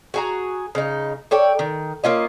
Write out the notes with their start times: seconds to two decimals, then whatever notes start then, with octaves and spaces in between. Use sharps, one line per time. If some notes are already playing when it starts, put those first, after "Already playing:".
0.14 F#4 G#4 A#5
0.75 C#3 D#4
1.31 A4 C#5 D5 G5
1.59 D#3
2.04 A#3 C#4 F4 D#5